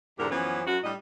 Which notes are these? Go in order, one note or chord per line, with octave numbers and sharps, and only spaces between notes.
E2 G#2 D3 G4 A#4
F#2 E3 F3 B3 C#4
F#2 F#4
A2 G3 D4 D#5